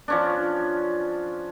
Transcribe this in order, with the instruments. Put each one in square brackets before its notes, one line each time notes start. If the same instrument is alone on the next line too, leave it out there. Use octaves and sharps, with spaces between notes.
[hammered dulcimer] F3 C#4 D4